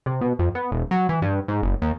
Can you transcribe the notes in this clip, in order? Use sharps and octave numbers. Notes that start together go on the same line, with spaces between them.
C3
B2
F2
B3
E1
F#3
E3
G2
G#2
F#1
D#2